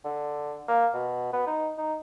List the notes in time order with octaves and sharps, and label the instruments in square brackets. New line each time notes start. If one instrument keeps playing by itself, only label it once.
[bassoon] D3
A#3
B2
B3
D#4
D#4